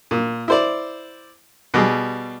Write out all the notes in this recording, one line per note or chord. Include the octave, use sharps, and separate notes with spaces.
A#2
E4 C5 D5
B2 G3 G#4